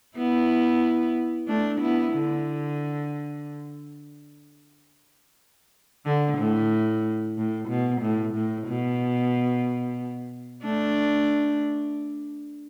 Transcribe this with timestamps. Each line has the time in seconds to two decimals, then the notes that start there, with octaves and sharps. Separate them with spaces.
0.17 B3 E4
1.48 A3 D4
1.80 B3 E4
2.13 D3
6.05 D3
6.38 A2
7.37 A2
7.69 B2
8.01 A2
8.34 A2
8.67 B2
10.63 A3 D4